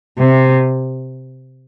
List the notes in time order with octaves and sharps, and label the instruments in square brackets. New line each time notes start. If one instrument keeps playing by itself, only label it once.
[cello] C3